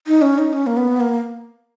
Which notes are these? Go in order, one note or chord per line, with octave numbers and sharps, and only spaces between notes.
D#4
C#4
D#4
C#4
A#3
B3
A#3